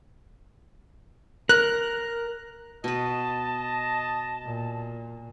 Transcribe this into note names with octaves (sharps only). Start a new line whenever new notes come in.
A#4 F#6
B2 B4 D#5 A5
A#2